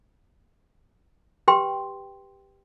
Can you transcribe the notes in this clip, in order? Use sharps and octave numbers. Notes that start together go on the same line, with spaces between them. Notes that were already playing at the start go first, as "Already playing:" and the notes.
G4 B4 G5 C6